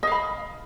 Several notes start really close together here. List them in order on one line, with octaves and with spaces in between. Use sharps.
D#5 F5 B5